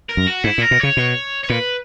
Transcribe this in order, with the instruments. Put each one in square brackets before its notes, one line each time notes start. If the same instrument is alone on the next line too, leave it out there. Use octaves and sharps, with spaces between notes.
[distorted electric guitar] A#4
[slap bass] F#2
[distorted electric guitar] F#4
[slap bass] G#2 [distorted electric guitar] E4
[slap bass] A#2
[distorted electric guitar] A#4
[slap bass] B2
[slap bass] C#3 [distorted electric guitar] C#5
[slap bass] B2
[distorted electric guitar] C#5
[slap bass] A#2 [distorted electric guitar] B4